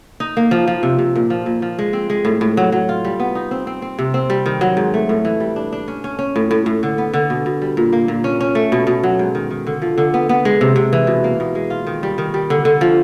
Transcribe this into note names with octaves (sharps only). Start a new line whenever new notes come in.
D#4
A#3
F3
F3
C3
C3
A#2
F3
A#2
F3
G#3
C4
G#3
A2
A2
F#3
F#3
F4
G3
B3
D#4
C4
C4
C4
C3
C4
G3
D#3
F#3
G#2
A3
A2
E3
G3
D4
D4
C#4
C#4
C#4
A2
A2
A2
D3
B3
D3
B2
B2
G3
A#2
A#3
A#2
C#4
C#4
A3
B2
B2
F#3
G#2
D#3
D#3
D3
F3
D3
B3
B3
G#3
C3
C3
E3
B2
A#3
B2
G#3
F4
D#3
G3
D#3
G3
D3
D3
F3